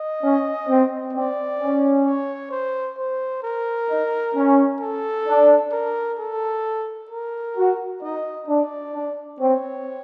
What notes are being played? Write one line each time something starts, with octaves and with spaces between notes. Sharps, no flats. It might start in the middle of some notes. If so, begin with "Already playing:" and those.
Already playing: D#5
C#4
C4
C4 D5
C#4
C#5
C5
C5
A#4
D#4
C#4
A4
D4
A#4
A4
A#4
F#4
D#4 D#5
D4 D5
D4
C4 C#5